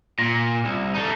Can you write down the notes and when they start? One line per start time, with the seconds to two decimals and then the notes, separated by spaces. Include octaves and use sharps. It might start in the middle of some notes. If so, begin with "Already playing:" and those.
0.19 A#2 A#6
0.65 C2
0.95 A3 D#4